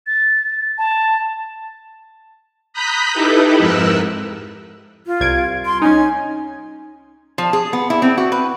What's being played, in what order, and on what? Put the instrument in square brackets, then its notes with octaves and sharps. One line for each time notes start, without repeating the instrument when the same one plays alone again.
[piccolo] A6
A5
[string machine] A#5 B5 D#6 F#6 G6 B6
D#4 E4 G4 A4 B4
F2 G#2 A#4 E6 F#6
[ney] F4
[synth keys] C2 G#6 D7
[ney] C6
[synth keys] C#4 D#4 [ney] G#5
[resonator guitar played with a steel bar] F3
G#4
B3
E4
C4
F#4
B4